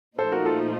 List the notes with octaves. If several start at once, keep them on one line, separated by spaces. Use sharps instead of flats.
A#2 F3 A3 D#4 A4 C5
F#4 A#4
F4 A4